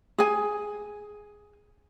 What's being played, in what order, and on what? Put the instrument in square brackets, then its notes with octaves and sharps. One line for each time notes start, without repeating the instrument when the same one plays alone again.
[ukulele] G#4 G#5